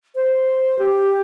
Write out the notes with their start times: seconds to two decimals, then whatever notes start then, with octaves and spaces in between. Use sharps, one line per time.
0.15 C5
0.79 G4